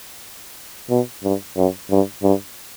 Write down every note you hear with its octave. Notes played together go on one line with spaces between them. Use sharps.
B2
G2
F#2
G2
G2